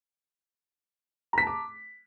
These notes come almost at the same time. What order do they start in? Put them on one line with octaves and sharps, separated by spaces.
A#5 B6 A5 D6